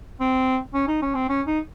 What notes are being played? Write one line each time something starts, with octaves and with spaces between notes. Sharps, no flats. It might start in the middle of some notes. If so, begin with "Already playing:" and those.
C4
C#4
D#4
C#4
C4
C#4
D#4